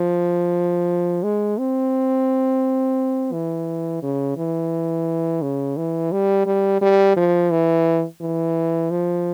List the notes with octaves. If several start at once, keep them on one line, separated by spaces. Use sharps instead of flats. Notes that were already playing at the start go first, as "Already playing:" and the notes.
Already playing: F3
G#3
C4
E3
C#3
E3
C#3
E3
G3
G3
G3
F3
E3
E3
F3